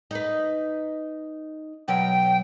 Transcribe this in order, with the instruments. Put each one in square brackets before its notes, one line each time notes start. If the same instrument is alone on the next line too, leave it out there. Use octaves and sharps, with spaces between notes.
[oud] D#4 B4
[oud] B2 F#3 [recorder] G5